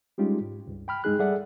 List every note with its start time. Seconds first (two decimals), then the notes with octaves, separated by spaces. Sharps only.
0.18 G3 G#3 C#4 D#4 F4 G4
0.41 G#2
0.67 C#2 G2
0.88 G5 B5 F6
1.04 G2 G#3 D#4 G#4 F#6
1.19 G3 G#4 A4 D5 E5 F#5